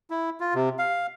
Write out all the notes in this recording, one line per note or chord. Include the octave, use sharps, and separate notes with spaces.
E4
F4
C3
F5